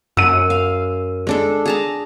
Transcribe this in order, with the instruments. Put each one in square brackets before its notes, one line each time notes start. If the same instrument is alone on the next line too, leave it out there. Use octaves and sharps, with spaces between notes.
[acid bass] F#2 [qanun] F#5 [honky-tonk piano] E6 D#7
[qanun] F5
G#3 D4 A4
G#4 A5 A#5